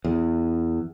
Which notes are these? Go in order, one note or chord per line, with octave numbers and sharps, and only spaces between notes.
E2